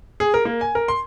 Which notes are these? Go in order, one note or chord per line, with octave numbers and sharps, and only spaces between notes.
G#4
A#4
A#3
G#5
A#4
C6